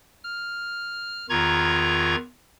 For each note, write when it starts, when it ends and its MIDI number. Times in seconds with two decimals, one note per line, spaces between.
0.24 1.26 89
1.30 2.15 40
1.30 2.15 51
1.30 2.15 65
1.30 2.15 82
1.30 2.15 85
1.30 2.15 92